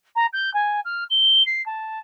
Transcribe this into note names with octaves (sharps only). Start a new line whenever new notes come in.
A#5
G6
G#5
F6
G7
C7
A5